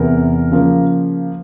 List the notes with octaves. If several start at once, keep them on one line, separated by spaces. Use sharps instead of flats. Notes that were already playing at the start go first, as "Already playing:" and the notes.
Already playing: E2 C3 E3 A#4
C#3 F3 A#3